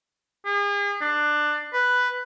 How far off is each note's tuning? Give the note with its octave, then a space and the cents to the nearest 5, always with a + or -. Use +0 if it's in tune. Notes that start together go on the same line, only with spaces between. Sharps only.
G#4 -40
D4 +20
B4 +5